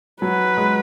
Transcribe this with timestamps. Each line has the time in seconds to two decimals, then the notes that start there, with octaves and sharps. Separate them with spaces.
0.22 F#3 B4
0.57 G#3